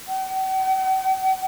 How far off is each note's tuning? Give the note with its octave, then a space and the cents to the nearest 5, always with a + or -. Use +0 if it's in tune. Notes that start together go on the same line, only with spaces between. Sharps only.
F#5 +45